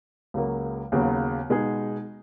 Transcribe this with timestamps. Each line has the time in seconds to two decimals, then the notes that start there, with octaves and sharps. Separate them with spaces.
0.34 C#2 C#3 F#3 A#3
0.92 D#2 C#3 F#3 B3
1.50 B2 G#3 D#4 G#4